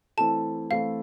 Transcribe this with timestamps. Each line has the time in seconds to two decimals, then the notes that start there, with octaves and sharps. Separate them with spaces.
0.17 E3 A3 C4 E4 A4 A5
0.71 E3 A3 C4 E4 A4 F5